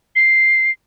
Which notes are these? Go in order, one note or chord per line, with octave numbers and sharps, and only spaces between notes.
C7